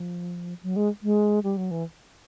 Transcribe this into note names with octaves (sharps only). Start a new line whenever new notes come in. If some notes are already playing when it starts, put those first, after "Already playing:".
Already playing: F3
F#3
G#3
G#3
G3
F#3
E3